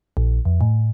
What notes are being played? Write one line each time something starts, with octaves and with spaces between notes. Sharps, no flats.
A#1
F2
A2